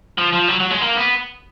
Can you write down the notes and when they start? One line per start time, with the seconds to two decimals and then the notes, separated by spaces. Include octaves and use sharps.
0.18 F3
0.33 F3
0.49 F#3
0.60 F#3
0.71 G#3
0.82 A#3
0.97 B3